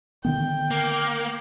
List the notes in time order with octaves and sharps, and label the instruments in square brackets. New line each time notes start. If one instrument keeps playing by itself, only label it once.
[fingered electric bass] D3 D#3 B3 [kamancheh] G5
[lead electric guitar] A#3